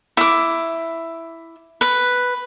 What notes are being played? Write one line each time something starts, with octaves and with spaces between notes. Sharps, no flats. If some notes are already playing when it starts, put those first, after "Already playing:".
E4 D6
B4